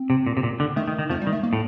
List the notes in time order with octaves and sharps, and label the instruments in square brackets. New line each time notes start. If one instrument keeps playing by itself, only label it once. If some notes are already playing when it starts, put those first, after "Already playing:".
Already playing: [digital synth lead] C4
[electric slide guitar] C3
A#2
C3
A#2
D3
[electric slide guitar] D#3 [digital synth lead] A3
[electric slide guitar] D#3
D#3
[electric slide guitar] F2 F3 [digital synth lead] A3
[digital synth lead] G3
[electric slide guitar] D#3
[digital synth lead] A3
A#3
[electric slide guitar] A2